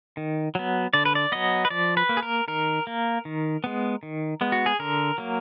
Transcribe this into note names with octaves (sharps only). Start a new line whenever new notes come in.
D#3
F#3 B3
D3 D5
B4
D5
F#3 B3 D#5
B4
F3 D5
B4
A#3
G#4
A#4
D#3 A#4
A#3
D#3
G#3 B3
D#3
G#3 B3
F#4
G#4
D3 A#4
F#3 A#3